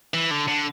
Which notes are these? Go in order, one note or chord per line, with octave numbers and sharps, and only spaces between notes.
E3
D3
D3